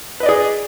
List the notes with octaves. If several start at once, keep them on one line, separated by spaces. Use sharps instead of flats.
G#4 B4 D5 D#5